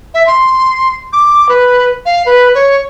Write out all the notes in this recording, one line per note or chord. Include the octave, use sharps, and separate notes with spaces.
E5
C6
D6
B4
F5
B4
C#5